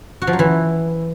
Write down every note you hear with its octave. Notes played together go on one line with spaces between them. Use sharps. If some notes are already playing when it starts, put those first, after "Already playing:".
F#4
F3
F#3
E3